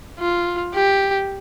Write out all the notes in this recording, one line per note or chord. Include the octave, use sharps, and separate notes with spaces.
F4
G4